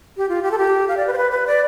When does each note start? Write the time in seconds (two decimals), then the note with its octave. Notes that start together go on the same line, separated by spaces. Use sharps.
0.17 G4
0.29 F4
0.43 G4
0.51 A4
0.58 G4
0.88 F5
0.97 D5
1.07 B4
1.13 C5
1.17 B4
1.31 B4
1.47 D5